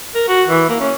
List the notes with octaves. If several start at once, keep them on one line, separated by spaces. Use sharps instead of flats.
A#4
F#4
E3
A#3
C#4